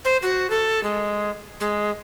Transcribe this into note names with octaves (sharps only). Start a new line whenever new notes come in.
C5
F#4
A4
G#3
G#3